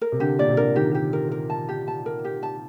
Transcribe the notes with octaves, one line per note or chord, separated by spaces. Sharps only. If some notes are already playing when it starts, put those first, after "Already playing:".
A#4
C3
D3 G4
A#2 D5
C3
D3 A#4
D#3 G4
G4
A#4
A#4
A5
G4
A5
A#4
G4
A5